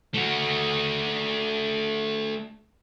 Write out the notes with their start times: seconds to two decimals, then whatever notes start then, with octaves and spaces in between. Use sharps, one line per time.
0.14 A3 F#4